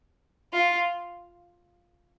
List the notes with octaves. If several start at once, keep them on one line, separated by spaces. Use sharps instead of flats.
F4